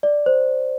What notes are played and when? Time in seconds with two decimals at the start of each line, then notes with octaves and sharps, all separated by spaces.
0.03 D5
0.26 C5